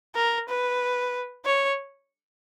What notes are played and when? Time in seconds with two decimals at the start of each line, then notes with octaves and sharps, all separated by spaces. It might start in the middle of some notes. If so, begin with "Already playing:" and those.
0.16 A#4
0.49 B4
1.46 C#5